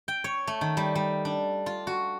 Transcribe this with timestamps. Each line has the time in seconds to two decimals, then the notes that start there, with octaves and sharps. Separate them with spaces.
0.08 G5
0.24 C#5
0.47 A3
0.61 D#3
0.77 G3
0.95 G3
1.25 D4
1.66 F4
1.87 F#4